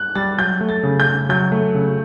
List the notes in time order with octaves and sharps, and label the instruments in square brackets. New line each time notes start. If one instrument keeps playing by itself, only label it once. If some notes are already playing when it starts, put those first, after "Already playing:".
Already playing: [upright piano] F#6
[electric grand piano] G3 [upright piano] A6
[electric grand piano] F#3 [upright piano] G6
[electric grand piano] A3
[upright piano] A6
[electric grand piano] C#3
[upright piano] G6
[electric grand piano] C#3
[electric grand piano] F#3 [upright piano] G6
[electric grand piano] A3
C#3